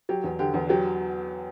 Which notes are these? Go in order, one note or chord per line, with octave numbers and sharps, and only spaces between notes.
F#3 G4
E2
D3 G4
E2
F#3 G4